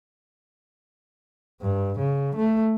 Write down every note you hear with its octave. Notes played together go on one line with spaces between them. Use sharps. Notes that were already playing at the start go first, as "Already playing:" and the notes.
G2
C#3
A3